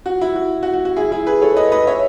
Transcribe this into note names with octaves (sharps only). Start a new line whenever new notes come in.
F#4
E4
F#4
F#4
F#4
F#4
E4 G#4
E4 G#4
G#4 B4
A4 C#5
B4 D#5
B4 D#5
C#5 E5